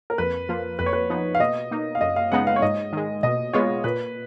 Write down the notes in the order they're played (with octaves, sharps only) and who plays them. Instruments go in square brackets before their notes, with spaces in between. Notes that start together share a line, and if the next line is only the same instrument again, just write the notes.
[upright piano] A#4
[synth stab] F2 [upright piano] B4
[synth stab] F3 A#3 F4
[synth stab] F2 [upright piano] B4
[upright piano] C#5
B4
[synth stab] F3 B3 D#4
[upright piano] F5
[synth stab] B2 [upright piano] D#5
[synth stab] A#3 D#4
[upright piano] F5
[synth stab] F#2 [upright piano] D#5
[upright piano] F5
[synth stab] C#3 G#3 B3 D#4 [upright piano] F#5
[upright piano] F5
C#5
[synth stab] G#2 [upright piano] D#5
[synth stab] D#3 G#3
[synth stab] B2 [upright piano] D#5
[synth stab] G#3 B3 F4 [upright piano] C#5
[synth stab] A#2 [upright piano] B4